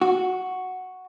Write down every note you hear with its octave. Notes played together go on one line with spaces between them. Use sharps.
F#4